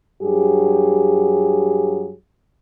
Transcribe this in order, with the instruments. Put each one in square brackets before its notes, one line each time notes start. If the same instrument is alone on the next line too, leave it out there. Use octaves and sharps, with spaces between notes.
[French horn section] G2 F#3 G4 G#4